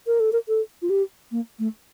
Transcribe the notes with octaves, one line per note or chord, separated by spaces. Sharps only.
A#4
A4
A#4
A4
F4
G4
A#3
A3